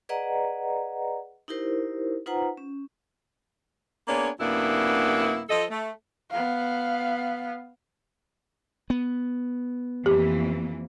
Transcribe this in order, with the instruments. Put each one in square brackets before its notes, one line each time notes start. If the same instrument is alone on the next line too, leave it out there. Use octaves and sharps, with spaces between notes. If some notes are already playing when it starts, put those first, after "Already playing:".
[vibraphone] G#4 B4 D5 D#5 F#5 A#5
D#4 E4 G4 A#4 C5
D#4 F4 B4 C5 F#5 A#5
C#4
[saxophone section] A#3 B3 D4 G#4 C#5
F#2 C3 A#3 B3 D4 E4
F3 A4 D#5
A3
[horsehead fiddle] B3 F5
[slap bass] B3
[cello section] F2 E3 A#3 [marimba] G4